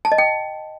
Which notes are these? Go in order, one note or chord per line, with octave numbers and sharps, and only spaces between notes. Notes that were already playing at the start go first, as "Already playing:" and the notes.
A5
D#5
G5